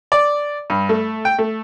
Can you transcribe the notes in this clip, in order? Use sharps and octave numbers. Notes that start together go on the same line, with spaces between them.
D5
G2
A3
G5
A3